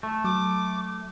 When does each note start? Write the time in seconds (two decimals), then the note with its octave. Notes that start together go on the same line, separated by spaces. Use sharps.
0.03 A3
0.24 F#3 D6